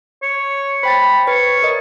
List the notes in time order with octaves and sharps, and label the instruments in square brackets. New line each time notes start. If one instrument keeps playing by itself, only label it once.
[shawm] C#5
[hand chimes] C5 G5 A6 [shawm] B5
[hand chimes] B4 [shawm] C#5
[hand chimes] A#4 D#5